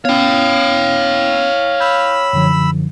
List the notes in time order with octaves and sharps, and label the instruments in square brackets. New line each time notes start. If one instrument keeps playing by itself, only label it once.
[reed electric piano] B3 C#4 [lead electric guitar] C#5 G5 [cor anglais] F5
[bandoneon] B5 E6 [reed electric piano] G6
[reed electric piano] F#2 D3 F3